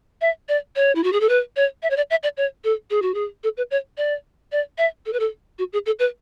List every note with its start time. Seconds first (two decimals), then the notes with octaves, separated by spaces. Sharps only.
0.21 E5
0.49 D5
0.76 C#5
0.95 E4
1.03 F#4
1.12 G#4
1.20 A4
1.29 B4
1.56 C#5
1.83 E5
1.90 C#5
1.97 D5
2.10 E5
2.23 D5
2.37 C#5
2.64 A4
2.90 G#4
3.02 F#4
3.14 G#4
3.44 A4
3.57 B4
3.71 C#5
3.97 D5
4.52 D5
4.78 E5
5.06 A4
5.13 B4
5.20 A4
5.58 F#4
5.73 G#4
5.86 A4
5.99 B4